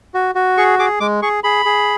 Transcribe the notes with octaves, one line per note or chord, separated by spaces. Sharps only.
F#4
F#4
G#4 C#6
G#4 D6
G#3 D6
G#4 C#6
G#4 B5
G#4